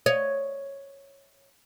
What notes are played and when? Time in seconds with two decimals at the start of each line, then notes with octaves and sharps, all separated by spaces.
0.06 C#5 D#5